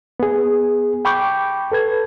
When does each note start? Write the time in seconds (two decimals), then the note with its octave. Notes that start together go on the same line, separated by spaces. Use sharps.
0.20 B3 G#4
1.05 G5 B5 C#6 D6 G6
1.72 A4 B4 G#6